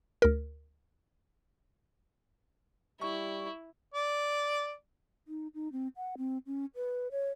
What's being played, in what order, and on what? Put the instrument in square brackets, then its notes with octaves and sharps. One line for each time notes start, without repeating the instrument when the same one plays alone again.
[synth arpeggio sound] D2 A#4
[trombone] G3 [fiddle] E4 [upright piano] C#6
[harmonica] D5
[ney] D#4
D#4
C4
F#5
C4
C#4
B4
C#5